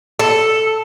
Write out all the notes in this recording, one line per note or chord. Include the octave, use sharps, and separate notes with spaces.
A4